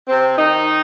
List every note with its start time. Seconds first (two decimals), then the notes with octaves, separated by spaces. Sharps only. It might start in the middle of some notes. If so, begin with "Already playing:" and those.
0.08 C3 C4
0.37 D#3 D#4